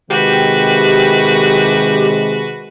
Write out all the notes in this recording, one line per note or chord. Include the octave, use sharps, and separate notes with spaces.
C3 D#3 G#3 F#4 G4 B4